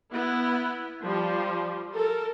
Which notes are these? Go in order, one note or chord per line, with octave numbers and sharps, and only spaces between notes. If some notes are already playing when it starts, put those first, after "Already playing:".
B3 E4
F3 G3
A4 A#4